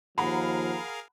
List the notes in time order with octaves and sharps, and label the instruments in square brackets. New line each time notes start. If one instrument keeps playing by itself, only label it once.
[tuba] D#2 [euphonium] F3 [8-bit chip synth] G#4 A#4 F5 [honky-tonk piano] F#5 A#5 B5